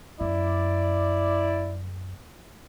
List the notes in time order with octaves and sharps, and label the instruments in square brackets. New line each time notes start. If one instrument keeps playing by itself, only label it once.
[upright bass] F#2 [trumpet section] E4 D5